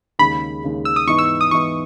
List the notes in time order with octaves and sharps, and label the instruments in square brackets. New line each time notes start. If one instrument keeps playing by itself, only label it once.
[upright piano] D#2 C#3 G#3 [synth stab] B5
[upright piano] D#2 C#3 G#3
[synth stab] E6
D#6
[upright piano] G#2 E3 B3 D#4 [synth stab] C#6
[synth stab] E6
D#6
[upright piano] G#2 E3 B3 D#4 [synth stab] C#6